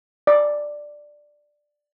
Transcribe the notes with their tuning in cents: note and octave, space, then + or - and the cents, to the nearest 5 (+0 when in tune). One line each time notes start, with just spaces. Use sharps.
D5 +5